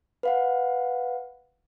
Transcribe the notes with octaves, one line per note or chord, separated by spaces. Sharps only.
B4 F5 F#5